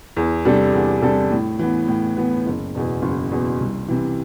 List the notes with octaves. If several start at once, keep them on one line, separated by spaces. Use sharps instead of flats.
E2
C3 G3 D4 A4
E2
C3 G3 D4 A4
A2
E3 B3
A2
E3 B3
F#1
E2 B2
F#1
E2 B2
C2
C3 E3